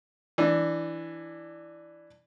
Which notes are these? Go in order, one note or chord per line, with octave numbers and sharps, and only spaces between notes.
E3 D4